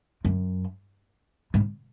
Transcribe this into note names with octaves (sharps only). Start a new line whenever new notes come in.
F#2
G#2